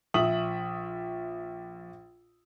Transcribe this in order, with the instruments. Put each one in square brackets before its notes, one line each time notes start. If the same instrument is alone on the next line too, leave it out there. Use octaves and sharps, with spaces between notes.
[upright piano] A#1 E5 D#6 F#7